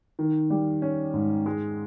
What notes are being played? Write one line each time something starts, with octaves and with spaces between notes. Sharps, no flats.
D#3
G3
C#4
G#2
G#3